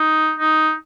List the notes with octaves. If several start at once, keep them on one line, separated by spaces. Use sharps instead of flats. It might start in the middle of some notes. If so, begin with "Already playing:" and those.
Already playing: D#4
D#4